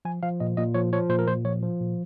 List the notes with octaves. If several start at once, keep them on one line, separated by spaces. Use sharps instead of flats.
F3 G#5
F3 F5
A#2 D#5
A#2 D#5
F3 C#5
F3 C#5
A#2 C5
A#4
A#2 C5
F3 C#5
F3
A#2